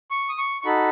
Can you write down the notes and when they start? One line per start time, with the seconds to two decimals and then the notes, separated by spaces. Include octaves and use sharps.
0.11 C#6
0.29 D#6
0.38 C#6
0.61 C#6
0.66 D#4 F#4 A4 B5